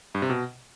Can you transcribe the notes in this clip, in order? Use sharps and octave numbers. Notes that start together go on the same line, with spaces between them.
G2
C3
B2